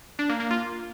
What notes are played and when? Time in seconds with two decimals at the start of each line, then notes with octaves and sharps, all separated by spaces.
0.19 D4
0.29 A#3
0.40 A#3
0.51 F4